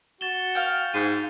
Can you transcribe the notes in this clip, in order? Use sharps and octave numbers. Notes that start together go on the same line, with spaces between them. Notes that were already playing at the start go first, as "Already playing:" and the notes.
F#4 A6 E7 G7
F5 G5
G#2 D#7